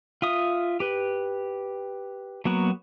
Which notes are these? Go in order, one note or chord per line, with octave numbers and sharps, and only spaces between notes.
F4 E5 D#6
G4 B4
F#3 A#3 B3 F#4